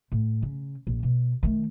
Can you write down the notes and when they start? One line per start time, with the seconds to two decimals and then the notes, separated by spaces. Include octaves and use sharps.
0.12 A2
0.42 C#3
0.87 A#1
1.03 B2
1.43 D#3 A3